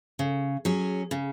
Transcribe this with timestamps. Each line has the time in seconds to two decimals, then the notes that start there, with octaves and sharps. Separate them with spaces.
0.19 C#3
0.65 F#3 C#4 G#4
1.11 C#3